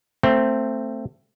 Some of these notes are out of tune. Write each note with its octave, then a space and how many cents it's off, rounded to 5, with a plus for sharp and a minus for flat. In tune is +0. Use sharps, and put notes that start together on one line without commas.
A3 +20 C4 +0